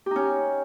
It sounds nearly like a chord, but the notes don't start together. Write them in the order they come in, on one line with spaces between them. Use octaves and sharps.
G4 D#4 C#4